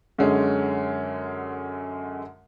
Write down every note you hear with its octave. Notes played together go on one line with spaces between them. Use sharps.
F#2 D3 G#3 C#4